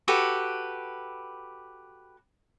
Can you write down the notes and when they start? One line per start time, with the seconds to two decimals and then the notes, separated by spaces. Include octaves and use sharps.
0.08 F#4 G4 A4 B4